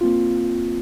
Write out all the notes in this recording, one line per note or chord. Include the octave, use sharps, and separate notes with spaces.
A#3 C4 F4